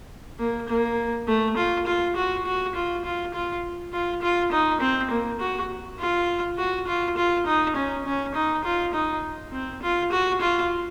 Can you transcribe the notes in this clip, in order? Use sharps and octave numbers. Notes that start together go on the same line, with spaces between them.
A#3
A#3
A3
F4
F4
F#4
F#4
F4
F4
F4
F4
F4
D#4
C4
A#3
F#4
F4
F#4
F4
F4
D#4
C#4
C#4
D#4
F4
D#4
C4
F4
F#4
F4